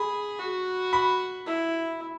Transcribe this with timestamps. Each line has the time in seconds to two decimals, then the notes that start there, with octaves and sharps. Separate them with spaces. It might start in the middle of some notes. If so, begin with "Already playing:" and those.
Already playing: G#4 B5
0.39 F#4
0.93 B5
1.46 E4